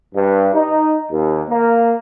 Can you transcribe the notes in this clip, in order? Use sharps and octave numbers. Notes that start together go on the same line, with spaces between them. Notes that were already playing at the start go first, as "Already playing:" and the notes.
G2
D#4
D#2
A#3